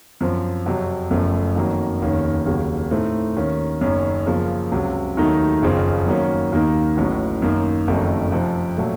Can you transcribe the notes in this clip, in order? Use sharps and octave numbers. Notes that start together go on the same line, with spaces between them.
F#2 F3 C4
F2 C3 F#3
F#1 F#2 F3 A3
F2 D#3 F#3 A#3
F1 D#2 D#3 A#3 C#4
F1 D#2 C#3 F#3
A2 A3 C4 D#4
D#2 D#3 A#3 C#4
F#1 F#2 D#3 A#3 C#4
F#2 C#3 F3 A#3
C#2 C3 F#3
D#2 D#3 F#3 A3 D#4
F#1 F2 C#3 F3 C4
F#2 D#3 F#3 A#3 C#4
D#2 D#3 A#3 D#4
A1 A2 F#3
F#2 D#3 A#3 D#4
F#1 F2 D#3 F#3 A3
F2 C3 F3
A#2 F#3 A3